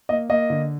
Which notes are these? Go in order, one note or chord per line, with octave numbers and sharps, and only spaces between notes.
A#3 D#5
A#3 D#5
D3